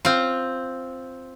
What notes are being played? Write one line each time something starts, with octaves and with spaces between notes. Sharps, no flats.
C4 F4